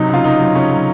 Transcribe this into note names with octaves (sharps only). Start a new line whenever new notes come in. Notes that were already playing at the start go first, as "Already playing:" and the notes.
Already playing: C3 F#3 D#4
C#3 F4
C#3 D#4
F#3
C#3 C#4
F#3